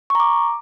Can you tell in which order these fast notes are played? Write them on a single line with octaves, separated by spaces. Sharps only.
C#6 A#5 D6